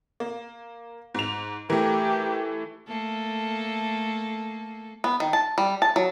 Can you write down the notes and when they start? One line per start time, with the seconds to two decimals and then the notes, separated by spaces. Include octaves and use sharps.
0.20 A#3
1.14 G#2 F7
1.70 E3 A3 G4 A#4
2.87 A3 A#3 A4
5.04 B3
5.20 D#3
5.33 A5
5.58 G3
5.82 A5
5.96 F#3